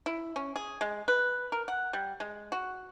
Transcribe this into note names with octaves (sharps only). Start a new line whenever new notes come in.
E4
C#4
G#4
G#3
B4
A#4
F#5
G3
G#3
F#4